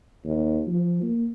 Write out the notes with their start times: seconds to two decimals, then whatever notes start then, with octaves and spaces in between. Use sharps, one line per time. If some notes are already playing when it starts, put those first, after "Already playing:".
0.25 D#2
0.67 F3
1.03 A#3